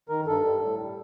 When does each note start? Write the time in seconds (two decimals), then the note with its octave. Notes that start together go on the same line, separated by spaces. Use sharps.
0.09 D#3 A#4
0.26 G2 A4
0.44 G3
0.61 A2
0.79 G3